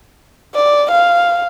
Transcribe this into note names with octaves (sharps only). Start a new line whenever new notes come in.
D5
F5